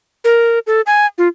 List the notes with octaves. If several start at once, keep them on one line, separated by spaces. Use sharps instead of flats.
A#4
A4
G#5
F4